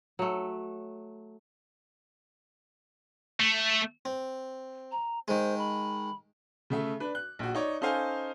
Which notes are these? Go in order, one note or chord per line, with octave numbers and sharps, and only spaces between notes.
F#3 A3
A3
C4
A#5
D#3 G#3 C5
B5
C#3 A3 E5
D4 B4
F#6
A#1 F#4
D#4 C#5 D5
C#4 D#4 A4 C5 F5 G#5